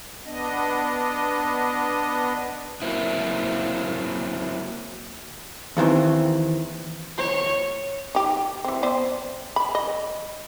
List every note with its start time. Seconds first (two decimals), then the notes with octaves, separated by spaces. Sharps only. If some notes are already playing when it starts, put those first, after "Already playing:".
0.25 B3 D4 D#5
2.82 F#3 A#3 C4 E4
5.77 D#2 D#3 E3 C4
7.18 C#5
8.15 D#4 G4
8.65 E3 C4
8.83 B3 C5 D5
9.56 B5
9.75 D#5